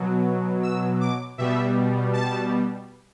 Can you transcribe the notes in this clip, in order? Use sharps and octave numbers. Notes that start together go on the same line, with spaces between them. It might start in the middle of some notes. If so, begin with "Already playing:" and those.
Already playing: B2 F#3
E6
D6
B2 G3 E5
A5